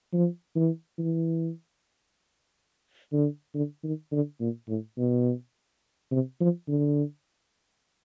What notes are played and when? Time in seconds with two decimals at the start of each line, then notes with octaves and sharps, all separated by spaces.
0.13 F3
0.56 E3
0.98 E3
3.13 D3
3.55 D3
3.84 D#3
4.12 D3
4.40 A#2
4.68 A2
4.97 B2
6.12 C3
6.41 F3
6.68 D3